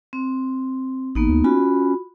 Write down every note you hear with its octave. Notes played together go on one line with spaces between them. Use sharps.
C4
A1 A#3 B3 D#4
D2
C#4 F4 F#4 B5